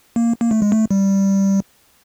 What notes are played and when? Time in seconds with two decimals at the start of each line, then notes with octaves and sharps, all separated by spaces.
0.16 A#3
0.41 A#3
0.51 A3
0.62 G#3
0.72 A3
0.91 G3